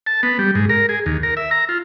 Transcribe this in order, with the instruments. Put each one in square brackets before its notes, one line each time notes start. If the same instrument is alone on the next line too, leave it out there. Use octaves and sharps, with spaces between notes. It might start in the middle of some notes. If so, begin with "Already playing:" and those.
[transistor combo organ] A5
B3
G3
G#2
A#4
G#4
D#2
A#4
E5
A#5
F4